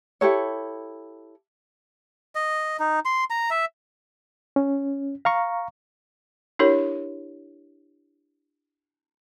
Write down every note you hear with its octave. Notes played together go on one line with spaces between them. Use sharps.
E4 G4 A4 C#5
D#5
D#4
C6
A#5
E5
C#4
F5 A#5 C#6
D4 E4 G4 A#4 C#5